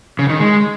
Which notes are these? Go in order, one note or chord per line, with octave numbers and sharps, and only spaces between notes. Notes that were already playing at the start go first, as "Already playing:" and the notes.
C#3
D#3
G#3